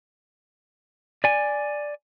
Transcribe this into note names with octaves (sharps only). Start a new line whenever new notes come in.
D5 G#5